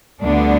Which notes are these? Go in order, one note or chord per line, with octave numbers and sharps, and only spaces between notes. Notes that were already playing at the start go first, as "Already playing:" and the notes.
D2 D3 G3 B3 D4